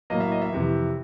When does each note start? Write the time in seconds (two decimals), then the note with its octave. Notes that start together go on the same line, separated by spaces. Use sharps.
0.10 A2 F#3 A#3 D#5
0.20 E5
0.32 D#5
0.42 E5
0.52 F2 C3 E3